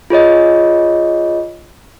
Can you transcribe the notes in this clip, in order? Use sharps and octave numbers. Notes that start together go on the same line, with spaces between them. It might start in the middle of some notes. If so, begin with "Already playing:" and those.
F4 G#4 C#5 D#5